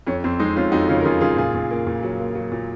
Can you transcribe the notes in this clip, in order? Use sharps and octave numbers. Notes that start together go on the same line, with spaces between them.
F2 C#4
F2 C4
G#3 C4 D#4
F2 C#4 F4
F2 D#4 F#4
C#3 C#4 F4
A#4
C#3 F4 G#4
C#3 F4 G#4
A#2 F4 G#4
A#2
A#3
A#2
F#3
A#3
F#3
A#2